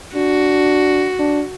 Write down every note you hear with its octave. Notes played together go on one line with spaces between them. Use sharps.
D4 F#4
D4